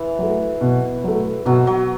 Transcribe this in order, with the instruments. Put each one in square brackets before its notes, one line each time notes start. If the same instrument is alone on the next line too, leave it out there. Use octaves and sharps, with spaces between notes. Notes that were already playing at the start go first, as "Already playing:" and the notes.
Already playing: [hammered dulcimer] E3
[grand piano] F#3 A3
B2
F#3 A3
[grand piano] B2 [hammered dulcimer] F#3
[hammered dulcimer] F#3